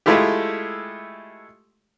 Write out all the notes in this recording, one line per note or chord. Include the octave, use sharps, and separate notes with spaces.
G#3 A3 E4 F4 G4